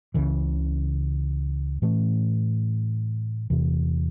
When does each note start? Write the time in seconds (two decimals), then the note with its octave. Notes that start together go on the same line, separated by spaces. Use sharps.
0.14 C#2 C#3 E3
1.82 A2 E3 A3 C#4
3.50 E2 C3 E3